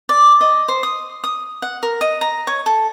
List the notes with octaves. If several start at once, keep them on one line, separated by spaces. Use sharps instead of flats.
D5
D#5
C5
D#6
D#6
F#5
A#4
D#5
A#5
C#5
A4